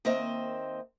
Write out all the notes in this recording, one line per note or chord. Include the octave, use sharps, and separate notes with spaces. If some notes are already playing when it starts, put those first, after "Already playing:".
D#2 A#3 C4 C5 D#5 E5